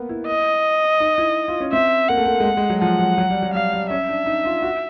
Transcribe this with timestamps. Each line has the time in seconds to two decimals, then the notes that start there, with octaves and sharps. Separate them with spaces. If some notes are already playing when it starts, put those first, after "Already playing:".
Already playing: A#3 B3
0.09 E4
0.27 D#5
1.00 D#4
1.18 E4
1.48 F4
1.60 C#4
1.73 C4 E5
2.09 A#3 F#5
2.17 A3
2.25 A#3
2.40 G#3
2.45 A3
2.57 G#3
2.70 F#3
2.81 F3 F#5
2.99 F#3
3.18 F#3
3.30 G3
3.42 F#3
3.54 G3 F5
3.73 G3
3.90 C#4 E5
4.09 D4
4.26 D#4
4.45 F4
4.63 F#4